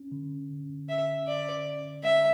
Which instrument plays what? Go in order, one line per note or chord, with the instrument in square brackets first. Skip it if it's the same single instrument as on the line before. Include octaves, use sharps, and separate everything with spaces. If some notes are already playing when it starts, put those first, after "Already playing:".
Already playing: [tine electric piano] C#4
D3
D3
[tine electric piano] D3 [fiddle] E5
[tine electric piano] D3 [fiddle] D5
[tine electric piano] D3
[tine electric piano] G#3 [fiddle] E5